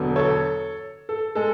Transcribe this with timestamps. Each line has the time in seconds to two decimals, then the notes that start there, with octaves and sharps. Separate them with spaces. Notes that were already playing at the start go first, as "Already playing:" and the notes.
Already playing: E1 E2 D3 F#3
0.16 A4 C#5
1.09 A4
1.35 G#3 A4